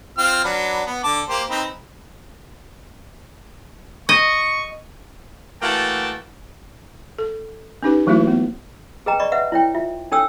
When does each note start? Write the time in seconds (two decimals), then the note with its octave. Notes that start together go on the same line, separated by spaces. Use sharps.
0.18 C4 F4 F6
0.45 F#3 D4 B4
0.87 B3
1.04 D3 A5 D6
1.28 A#3 G4 C5
1.49 C4 D#4 B4
4.09 D#5 C#6
5.62 E3 A3 A#3 F#4 G5 A5
7.18 A4
7.83 C#4 D#4 G4 B4
8.06 E3 F#3 A3 A#3 E4 F#4
8.27 B3
9.06 G#4 B4 D#5 G5 A#5
9.19 D5 D#5 B5 C#6
9.32 B4 E5 F#5
9.52 E4 C#5 G5
9.75 F4 E5
10.12 D4 A4 C#5 G5 D#6 E6